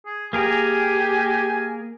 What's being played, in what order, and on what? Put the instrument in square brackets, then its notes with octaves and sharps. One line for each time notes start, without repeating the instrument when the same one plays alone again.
[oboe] G#4
[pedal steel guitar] A#3 G#4 A#4 [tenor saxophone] G4 [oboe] G#5